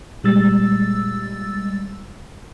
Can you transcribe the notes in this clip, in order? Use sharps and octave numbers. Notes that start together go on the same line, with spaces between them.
A#2 G3 G#3 E6 A6